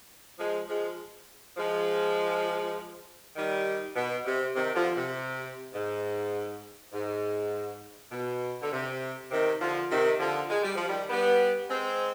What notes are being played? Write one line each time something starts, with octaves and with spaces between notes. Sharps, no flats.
F3 G#3
F3 G#3
F3 G#3
D#3 G3
B2
C3
C3 D#3
D3 F3
C3
G#2
G#2
B2
D3
C3
C3 D#3
D3 F3
C3 D#3
D3 F3
G#3
G3
F3
D#3 G3
G3 B3
G#3 C4